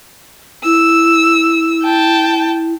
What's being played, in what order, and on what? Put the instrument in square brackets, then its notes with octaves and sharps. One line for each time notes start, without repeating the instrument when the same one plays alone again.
[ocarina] E4 [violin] E6
[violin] G5 A5